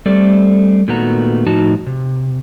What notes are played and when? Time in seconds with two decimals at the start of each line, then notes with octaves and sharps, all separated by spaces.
0.06 G3 A3 C4 A4 D5
0.88 A#2 D#3 A3 B3 F#4 A#5
1.46 A2 F3 D#4 F#4 A5
1.86 C3